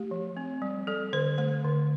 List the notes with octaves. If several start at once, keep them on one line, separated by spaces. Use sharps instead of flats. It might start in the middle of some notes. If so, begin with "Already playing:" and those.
Already playing: A3 G4
F3
C4
G3
G3 A4
D3 C5
A3 C5
D3